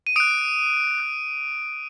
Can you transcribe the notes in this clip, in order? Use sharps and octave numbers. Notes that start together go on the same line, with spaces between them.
D#7
D#6 F#6 D7
D#6 F#6